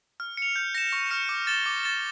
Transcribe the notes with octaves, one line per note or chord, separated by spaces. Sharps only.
F6
C#7 F7
G6
A#6 E7
C#6
F6 C#7
D6
A6 E7 G7
D6
A6 E7 G7